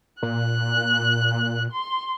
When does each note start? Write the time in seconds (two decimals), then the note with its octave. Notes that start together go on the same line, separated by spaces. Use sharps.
0.23 A#2 F#6
1.72 C6